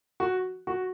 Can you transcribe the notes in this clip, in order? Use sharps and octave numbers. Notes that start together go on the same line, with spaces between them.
F#4
F#4